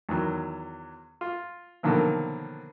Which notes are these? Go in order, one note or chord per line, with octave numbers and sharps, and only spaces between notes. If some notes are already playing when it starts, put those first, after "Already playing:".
E2 D#3 F#3
F4
B2 D3 D#3 F3 F#3 A#3